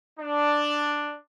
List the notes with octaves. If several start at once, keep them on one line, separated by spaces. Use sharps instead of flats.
D4